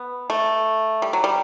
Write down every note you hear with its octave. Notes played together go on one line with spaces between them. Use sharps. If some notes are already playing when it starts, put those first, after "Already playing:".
Already playing: B3
A3
G3
F#3
G3